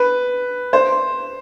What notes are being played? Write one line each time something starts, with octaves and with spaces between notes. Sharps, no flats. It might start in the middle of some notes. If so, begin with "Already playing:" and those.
Already playing: B4
C5